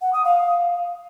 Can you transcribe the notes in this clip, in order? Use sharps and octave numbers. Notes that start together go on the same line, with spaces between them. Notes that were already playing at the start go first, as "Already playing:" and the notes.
F#5
D#6
F5